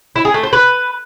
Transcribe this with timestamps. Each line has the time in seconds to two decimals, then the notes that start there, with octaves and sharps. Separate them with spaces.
0.16 E4
0.25 G#4
0.34 A3
0.43 C5
0.53 B4